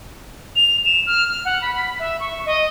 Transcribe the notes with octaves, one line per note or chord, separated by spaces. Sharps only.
F7
E7
F6
F6
F#5
B5
B5
E5
C#6
D#5